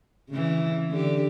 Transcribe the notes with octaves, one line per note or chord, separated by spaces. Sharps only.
C#3 E3
D3 G4